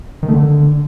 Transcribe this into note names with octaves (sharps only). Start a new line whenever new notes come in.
D#3
A3
D3